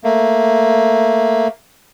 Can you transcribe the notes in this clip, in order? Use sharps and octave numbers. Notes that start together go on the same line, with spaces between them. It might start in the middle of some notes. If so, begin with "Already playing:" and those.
A3 A#3